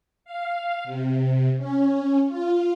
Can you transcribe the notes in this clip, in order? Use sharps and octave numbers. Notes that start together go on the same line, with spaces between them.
F5
C3
C#4
F4